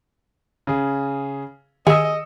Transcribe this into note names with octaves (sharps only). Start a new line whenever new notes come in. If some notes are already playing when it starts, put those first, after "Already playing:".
C#3 G#4
D#3 G#4 D#5 E6 C#7